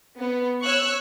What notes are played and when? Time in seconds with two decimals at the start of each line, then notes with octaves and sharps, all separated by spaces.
0.19 B3
0.62 C#5 C#6 E6 F#6